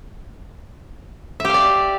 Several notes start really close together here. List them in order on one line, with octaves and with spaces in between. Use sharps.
E5 G4 F5 D5